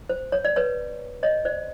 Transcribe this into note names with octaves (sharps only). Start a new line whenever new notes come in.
C5
C#5
D5
B4 C#5
C#5 D#5
C5 D5